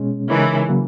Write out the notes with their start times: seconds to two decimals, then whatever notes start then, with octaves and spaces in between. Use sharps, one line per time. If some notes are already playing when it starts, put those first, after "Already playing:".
Already playing: B2 G#3 C#4
0.30 C#3 E3 G#3 D#4 A#4 C#5
0.69 C#3 F#3 A#3